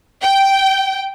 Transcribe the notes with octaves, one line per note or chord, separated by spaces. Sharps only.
G5